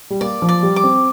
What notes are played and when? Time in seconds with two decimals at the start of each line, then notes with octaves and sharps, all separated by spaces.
0.10 G3
0.21 A#3 D5
0.42 F3
0.49 D5
0.63 G3
0.76 D6
0.84 C4